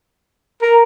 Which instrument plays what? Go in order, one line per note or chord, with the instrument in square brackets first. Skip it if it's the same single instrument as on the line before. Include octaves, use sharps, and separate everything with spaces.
[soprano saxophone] A#4